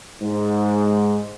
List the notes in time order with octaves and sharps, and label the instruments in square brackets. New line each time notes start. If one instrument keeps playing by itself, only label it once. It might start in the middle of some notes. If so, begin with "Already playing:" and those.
[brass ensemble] G#2